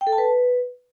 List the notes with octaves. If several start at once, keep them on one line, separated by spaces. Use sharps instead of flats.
G5
A4
A5
B4